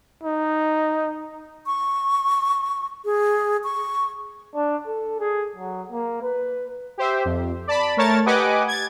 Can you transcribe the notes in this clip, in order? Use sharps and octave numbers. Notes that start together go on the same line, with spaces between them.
D#4
C#6
G#4
C#6
D4
A4
G#4
F#3
A#3
B4
G4 C5 E5
F2
D5 A5 B5
A3 A#4 C#5 A5 A6
G4 B4 D#5 F#5 G#5 D6
G#6 A6